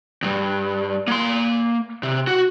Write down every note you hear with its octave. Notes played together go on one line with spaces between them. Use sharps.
D2 G2
A#3 C6
C3
F#4